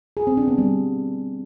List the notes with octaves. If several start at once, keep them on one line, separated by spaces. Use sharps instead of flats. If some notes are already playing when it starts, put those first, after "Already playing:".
G#4
C4
D4
B3
G3